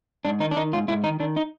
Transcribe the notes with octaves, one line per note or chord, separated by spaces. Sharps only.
G#2 D4
D#3 D#4
D4
D#3 D#4
G#2 F4
G#2 E4
D#3 D#4
D#3 D4
D#4